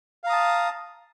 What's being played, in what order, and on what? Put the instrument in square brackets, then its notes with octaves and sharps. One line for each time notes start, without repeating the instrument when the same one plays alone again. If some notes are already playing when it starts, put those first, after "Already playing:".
[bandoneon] F5
A#5
D#6
A5